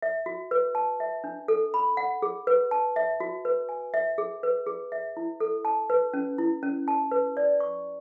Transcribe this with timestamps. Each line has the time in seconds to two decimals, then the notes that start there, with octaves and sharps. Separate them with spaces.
0.02 E5
0.26 F#4
0.51 B4
0.75 A5
1.00 E5
1.24 D4
1.48 A4
1.74 B5
1.97 F#5
2.22 G#4
2.47 B4
2.71 A5
2.96 E5
3.20 F#4
3.45 B4
3.69 G#5
3.94 E5
4.18 G#4
4.43 B4
4.67 G#4
4.92 E5
5.17 E4
5.40 A4
5.65 A5
5.90 B4
6.14 C#4
6.38 E4
6.63 C#4
6.88 A5
7.11 B4
7.37 D5
7.60 C#6